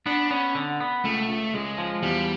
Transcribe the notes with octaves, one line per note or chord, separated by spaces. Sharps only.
B3 D4
B3 C#4
D3
B3
C#2 A3
C#2
C#2 G#3
F3
E2 G3